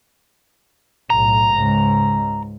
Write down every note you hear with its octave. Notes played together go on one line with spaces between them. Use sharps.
B1 A2 A#5
C#2 G#2